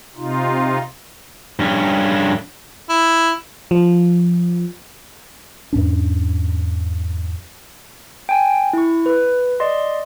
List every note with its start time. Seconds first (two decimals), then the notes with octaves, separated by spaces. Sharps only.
0.17 C3 D#4 F4
1.60 G2 C#4
2.89 E4
3.71 F3
5.73 E2 G#2 C#4 D4
8.29 G5 G#5
8.73 E4 C#6
9.06 B4
9.60 D5 D#5 C6